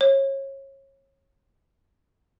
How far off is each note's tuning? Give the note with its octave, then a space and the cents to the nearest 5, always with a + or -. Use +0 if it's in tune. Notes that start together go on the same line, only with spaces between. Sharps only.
C#5 -30